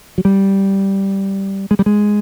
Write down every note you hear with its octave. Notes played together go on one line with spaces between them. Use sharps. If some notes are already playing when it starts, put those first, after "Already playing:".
F#3
G3
G#3
G3
G#3